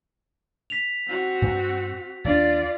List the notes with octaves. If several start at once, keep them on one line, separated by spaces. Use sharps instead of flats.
B6 F7
C4 F#4
G2
D#2 D4 F4 D5